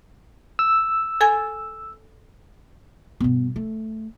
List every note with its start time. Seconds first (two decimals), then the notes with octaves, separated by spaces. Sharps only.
0.59 E6
1.21 A4 G#5 G#6
3.20 G2 B2
3.56 A3